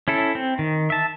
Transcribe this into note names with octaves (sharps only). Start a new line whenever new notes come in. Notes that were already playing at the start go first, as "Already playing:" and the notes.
C#4 E4 A4
C4
D#3
E5 A5